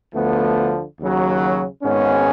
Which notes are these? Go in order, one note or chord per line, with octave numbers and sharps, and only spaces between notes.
D2 D3 F3 A3 B3
D#2 C#3 F#3
G#1 G#2 D#3 B3 C#4